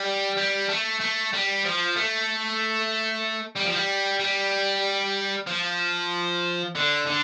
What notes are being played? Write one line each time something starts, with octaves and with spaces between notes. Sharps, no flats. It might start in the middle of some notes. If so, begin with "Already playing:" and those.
Already playing: G3
G3
A3
A3
G3
F3
A3
G3
F3
G3
G3
F3
D3
D3